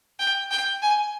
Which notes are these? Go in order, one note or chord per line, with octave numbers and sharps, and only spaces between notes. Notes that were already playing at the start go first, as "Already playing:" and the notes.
G5
G5
G#5